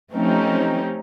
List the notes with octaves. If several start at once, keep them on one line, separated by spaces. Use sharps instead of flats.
F3 A3 C4 C#4 D#4 G4